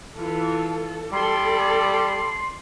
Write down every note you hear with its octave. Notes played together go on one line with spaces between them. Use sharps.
E3 F4 A4
G3 A4 D5 C6